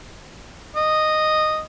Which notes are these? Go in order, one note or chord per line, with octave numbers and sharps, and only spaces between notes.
D#5